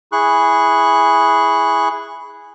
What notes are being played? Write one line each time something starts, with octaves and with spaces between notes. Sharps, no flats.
E4 G#4 C#6 F#6